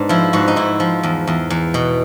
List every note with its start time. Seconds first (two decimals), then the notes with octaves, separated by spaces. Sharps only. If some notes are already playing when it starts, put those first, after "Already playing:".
Already playing: G#2 B3 D4
0.09 F3 E4
0.33 G#2 F#4
0.48 D#4
0.56 G#2 E4
0.80 F3
1.03 E2
1.27 E2
1.50 E2
1.74 B2